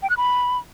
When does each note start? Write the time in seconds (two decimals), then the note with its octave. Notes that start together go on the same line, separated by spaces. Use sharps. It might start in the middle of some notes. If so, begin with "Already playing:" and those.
0.03 G5
0.10 F#6
0.17 B5